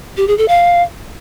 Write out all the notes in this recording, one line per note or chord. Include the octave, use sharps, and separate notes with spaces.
G4
G#4
A4
F5